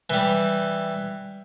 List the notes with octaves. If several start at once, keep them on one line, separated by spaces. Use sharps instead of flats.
E3 G3